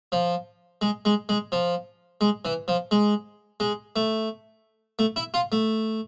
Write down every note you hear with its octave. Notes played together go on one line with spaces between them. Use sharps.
F3
G#3
G#3
G#3
F3
G#3
E3
F3
G#3
G#3
A3
A3
E4
F4
A3